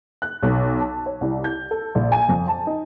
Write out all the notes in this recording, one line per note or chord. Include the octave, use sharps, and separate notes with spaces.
F#6
B1
A5
C#5
C2
G6
A4
A#1
G#5
F2
A5
D#4